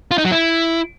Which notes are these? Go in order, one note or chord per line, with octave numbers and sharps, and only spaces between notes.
F4
D#4
F#3
E4